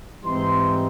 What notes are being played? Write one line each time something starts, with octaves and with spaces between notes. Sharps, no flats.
G#2 E3 G3 C4 D#4 C6